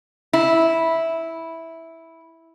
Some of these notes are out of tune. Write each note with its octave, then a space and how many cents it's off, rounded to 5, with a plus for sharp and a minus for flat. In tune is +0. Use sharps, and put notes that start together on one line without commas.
E4 -10